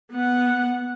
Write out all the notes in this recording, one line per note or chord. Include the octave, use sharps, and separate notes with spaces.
B3 F#5